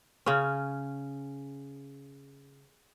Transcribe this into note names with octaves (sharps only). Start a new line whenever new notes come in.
C#3 C#4